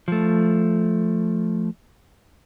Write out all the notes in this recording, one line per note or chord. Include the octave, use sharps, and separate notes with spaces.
F3 A3